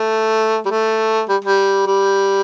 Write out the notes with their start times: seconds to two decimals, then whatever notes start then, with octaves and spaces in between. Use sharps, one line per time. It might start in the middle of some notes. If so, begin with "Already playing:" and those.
Already playing: A3
0.65 G3
0.71 A3
1.29 G3
1.44 G3
1.87 G3